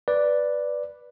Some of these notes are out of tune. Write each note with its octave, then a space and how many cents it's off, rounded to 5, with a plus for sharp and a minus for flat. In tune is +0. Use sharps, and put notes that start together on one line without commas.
B4 +0 D5 +0